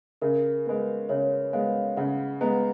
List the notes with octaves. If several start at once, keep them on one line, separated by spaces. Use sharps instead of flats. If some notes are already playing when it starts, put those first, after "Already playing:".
C#3 A#4
G#3 B3 B4
C#3 C#5
G#3 B3 F5
C#3 F#5
G#3 B3 A#5